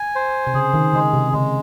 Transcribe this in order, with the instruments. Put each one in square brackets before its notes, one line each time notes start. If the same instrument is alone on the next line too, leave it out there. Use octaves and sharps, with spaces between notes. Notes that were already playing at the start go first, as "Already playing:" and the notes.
Already playing: [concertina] G#5
C5
[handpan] C3
[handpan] C#3 [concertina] G#4
[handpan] D#3
[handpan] C#3 [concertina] G#3
[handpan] C3
[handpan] C#3 [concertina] G#3